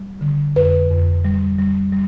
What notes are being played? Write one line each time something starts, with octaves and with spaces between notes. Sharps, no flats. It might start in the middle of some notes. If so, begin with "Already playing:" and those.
Already playing: G3
D3
F2 B4
F2
G3
G3
G3